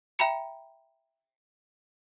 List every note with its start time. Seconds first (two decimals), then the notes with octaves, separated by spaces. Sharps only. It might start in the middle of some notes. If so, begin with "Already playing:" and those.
0.19 E5 G5 A#5 B5 C#7